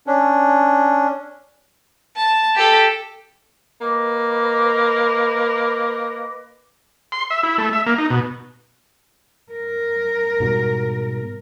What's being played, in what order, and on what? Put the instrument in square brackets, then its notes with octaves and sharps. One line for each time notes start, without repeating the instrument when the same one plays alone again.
[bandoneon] C#4 D4
[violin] A5
G4 A4
[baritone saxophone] A#3 [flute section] B4 D#5 D6
[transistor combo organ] C6
E5
E4
A3
E5
A#3
D#4
B2
[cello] A#4
[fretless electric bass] G#2 B2 G3